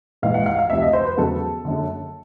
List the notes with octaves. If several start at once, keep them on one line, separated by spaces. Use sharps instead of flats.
A#1 G#2 E3 G#3 F5
F#5
F5
F5
D2 C3 F3 E5
D#5
C5
B4
E2 C#3 F#3 A4
F#1 F#2 D3